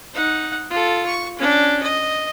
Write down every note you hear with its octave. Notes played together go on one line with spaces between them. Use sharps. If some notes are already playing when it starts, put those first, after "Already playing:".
D#4 F#5
F4 A4
C#6
C#4 D4
D#5